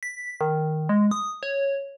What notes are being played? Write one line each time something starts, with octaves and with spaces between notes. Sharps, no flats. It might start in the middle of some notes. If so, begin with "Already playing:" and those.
B6
D#3
G#3
D#6
C#5